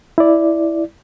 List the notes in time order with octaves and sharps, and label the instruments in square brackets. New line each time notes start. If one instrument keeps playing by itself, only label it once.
[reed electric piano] E4 D5